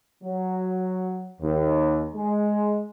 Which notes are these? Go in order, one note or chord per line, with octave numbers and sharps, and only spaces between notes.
F#3
D#2
G#3